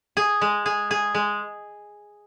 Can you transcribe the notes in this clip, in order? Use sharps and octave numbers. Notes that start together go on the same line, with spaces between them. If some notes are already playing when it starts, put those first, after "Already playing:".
G#4
G#3
G#4
G#4
G#3